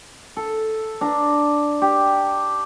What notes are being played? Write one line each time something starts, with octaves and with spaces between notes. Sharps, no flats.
A4
D4 A#5
G4